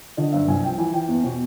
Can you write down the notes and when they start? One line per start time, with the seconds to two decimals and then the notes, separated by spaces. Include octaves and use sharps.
0.17 D3 D#5
0.32 G2 E5
0.48 C2 G#5
0.63 F3 G5
0.78 E3 G#5
0.93 E3 G5
1.08 E2
1.24 B2